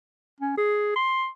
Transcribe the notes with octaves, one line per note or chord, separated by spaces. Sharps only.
C#4
G#4
C6